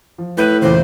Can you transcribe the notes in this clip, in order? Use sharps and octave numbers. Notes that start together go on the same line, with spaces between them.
F3
A2 B4 F#6 G6 D#7
E2 A#2 C#3 C5